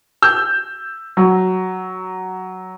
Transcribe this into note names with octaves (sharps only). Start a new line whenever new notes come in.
E6 G6
F#3